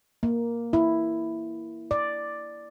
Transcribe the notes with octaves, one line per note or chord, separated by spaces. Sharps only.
A#3
E4
D5